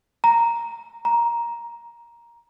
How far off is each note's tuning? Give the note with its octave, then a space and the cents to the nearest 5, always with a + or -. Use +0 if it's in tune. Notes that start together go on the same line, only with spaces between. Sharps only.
A#5 -5
A#5 +10